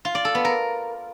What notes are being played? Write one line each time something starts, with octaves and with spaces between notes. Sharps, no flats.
F4
D5
A4
B3
A#4